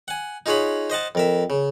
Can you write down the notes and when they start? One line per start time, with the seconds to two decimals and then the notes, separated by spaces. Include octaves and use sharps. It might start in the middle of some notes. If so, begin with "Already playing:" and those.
0.08 F#5 G#5
0.46 D#4 F4 G#4 C#5 F#5 B5
0.90 C5 D#5 F#5 A5
1.15 F2 A#4 E5
1.50 C#3